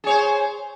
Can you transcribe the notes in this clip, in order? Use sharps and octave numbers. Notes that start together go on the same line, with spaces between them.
G#4 C5 C#5